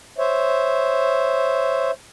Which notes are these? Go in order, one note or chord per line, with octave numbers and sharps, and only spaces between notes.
C5 C#5 E5